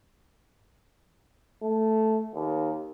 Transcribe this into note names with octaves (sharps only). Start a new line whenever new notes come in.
A3
D#2